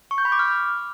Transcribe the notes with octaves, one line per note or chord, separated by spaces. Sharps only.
C#6
G6
B5
D6
F6